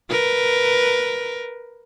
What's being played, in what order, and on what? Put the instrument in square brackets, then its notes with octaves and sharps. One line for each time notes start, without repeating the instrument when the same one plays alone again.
[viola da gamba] A#4 B4